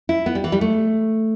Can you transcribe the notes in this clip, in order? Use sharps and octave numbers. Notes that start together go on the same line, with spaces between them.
E4
B3
G3
E3
G3
A3